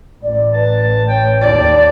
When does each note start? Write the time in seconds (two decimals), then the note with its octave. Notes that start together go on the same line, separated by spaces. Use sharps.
0.22 A1 D5
0.54 B4 A5
1.08 C#5 G5
1.41 D#2 D5 A5